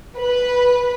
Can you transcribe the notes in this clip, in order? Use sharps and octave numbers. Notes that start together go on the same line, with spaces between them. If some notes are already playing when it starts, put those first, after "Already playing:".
B4